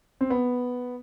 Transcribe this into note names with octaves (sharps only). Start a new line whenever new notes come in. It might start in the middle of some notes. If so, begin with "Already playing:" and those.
C4
B3